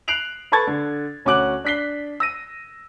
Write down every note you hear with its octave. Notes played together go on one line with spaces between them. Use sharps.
F#6 C7 D7 F7 F#7
A4 B4 A5 C#6 G#6 A6
D3
D2 C#4 F#4 D6 F#6 F#7
D4 F#6 B6 C7 G7
E6 A#6 D#7